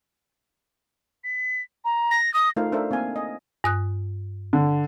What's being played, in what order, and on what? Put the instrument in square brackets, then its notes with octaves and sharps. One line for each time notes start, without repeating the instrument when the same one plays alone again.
[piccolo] B6
A#5
[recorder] A#6
[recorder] D#6 [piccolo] A#6
[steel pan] A3 D#4 F4 A#4 C5 F5
D4 A4 A#4 C5 E5 F5
A#3 C4 F5 G#5
D#5 G#5
[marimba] G2 D#6 F#6
[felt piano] D3